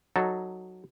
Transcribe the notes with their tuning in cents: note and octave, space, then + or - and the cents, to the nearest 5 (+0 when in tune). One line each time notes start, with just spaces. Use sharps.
F#3 +0 D#4 +0 A4 +0